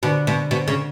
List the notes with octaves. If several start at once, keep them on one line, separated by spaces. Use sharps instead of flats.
B2 D3
B2
B2
C#3